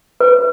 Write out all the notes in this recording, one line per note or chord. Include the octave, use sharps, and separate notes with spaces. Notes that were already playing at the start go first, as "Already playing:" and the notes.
B4